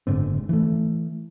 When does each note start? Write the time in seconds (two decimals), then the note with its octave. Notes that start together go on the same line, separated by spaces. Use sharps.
0.07 F#1 G#2 D3 C4
0.49 E3 A3